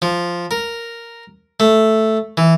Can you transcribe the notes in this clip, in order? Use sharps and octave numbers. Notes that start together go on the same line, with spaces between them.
F3
A#4
A3
E3